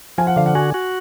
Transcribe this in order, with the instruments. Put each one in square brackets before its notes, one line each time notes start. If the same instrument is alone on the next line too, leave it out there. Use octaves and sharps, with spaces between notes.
[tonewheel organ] F3 [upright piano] G#5
[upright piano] F#5
[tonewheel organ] D3 [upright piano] F5
[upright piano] F#5
[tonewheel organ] F#4 [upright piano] G#5
[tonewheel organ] F#4